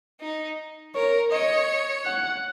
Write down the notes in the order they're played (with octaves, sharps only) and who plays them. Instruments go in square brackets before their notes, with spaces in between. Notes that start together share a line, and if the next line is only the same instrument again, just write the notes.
[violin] D#4
[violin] A#4 [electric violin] C#5
[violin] C#5 [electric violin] D#5
[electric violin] F#5